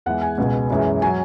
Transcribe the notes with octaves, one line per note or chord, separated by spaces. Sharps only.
E2 E3 G#3 F#5
G#5
C#2 B2 G#3
F#2 E3 G#3
F#3 G#5